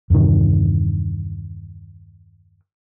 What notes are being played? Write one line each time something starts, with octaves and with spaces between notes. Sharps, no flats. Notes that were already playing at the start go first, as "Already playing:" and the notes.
E2 G2 C3 D#3